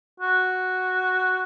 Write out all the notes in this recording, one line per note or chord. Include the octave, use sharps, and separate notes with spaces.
F#4